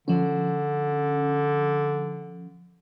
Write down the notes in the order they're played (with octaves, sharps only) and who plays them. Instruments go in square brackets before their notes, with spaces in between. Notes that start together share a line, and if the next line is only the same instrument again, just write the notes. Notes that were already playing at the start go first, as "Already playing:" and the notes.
[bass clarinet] D3 [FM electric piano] F3 C#4